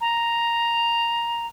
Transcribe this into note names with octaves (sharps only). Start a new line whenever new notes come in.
A#5